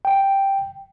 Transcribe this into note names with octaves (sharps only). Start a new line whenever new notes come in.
G5